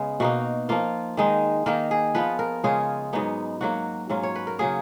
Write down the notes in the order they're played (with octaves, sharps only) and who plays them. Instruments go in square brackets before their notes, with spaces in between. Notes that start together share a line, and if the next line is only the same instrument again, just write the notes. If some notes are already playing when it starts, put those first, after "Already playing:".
Already playing: [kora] C#3 G#3 B3
B2 A#3 D#4 F#4
F3 A#3 F4
D#3 G#3 D#4
D#3 A#3 D#4 A#4
G#4
F3 B3 F4 B4
A#4
C#3 G#3 C#4 F4 G#4
G#2 F#3 B3 D#4
G#2 F#3 A#3 F#4
G#2 F#3 C#4 F4
C#5
B4
A#4
C#3 F#3 A#3 G#4